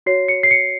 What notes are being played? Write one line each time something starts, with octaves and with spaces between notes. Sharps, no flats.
F#4 C#5 C7
C#7
C7
C#7